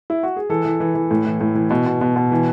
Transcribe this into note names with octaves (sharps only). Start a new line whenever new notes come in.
E4
F#4
G#4
E3 A4
E3
E3
E3
A2
E3
A2
E3
B2
B2
B2
B2
E3